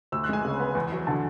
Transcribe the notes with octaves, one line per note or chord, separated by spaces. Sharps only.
D2 E6
F#6
G#3 G#5
C#3
B3
E2
F#3
D3 A5